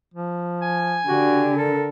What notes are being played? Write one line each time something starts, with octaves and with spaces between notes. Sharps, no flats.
F3
G#5
D3 F#4 G4
A4 A#4